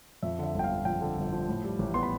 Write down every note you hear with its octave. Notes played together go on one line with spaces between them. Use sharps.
F2 E5
D3 E5
G1 G5
F5
F3
F2 G5
D3
G1
F3
A2
G3
A1
B3 C6
B5